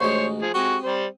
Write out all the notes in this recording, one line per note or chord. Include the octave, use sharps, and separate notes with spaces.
A1 D2 G#3 C5 C#5 C#6
F3 G#4
G#3 C4 F#4 G4 D#6
G3 C5